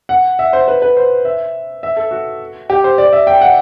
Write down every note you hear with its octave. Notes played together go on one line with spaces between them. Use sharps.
F#5
E5
C5
B4
B4
C5
E5
E5
A4
F#4
G4
C5
D5
E5
G5
F#5